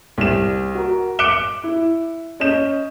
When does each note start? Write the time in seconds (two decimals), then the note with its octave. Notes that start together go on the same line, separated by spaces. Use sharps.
0.18 C2 E7
0.75 F#4 A#4
1.19 D6 F#6 C#7 D7 E7 G7
1.64 E4
2.40 C#4 D#5 G6 E7